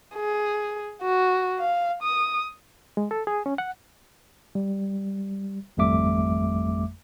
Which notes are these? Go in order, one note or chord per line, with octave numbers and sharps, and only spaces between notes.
G#4
F#4
F5
D#6
G#3
A4
G#4
C#4
F#5
G3
G#1 F2 G3 A3 E5 D6